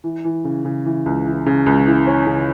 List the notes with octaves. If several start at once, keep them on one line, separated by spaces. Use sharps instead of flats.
E3
E3
C#3
C#3
E3
C#2
E3
C#3
C#2
E3
C#4
C#3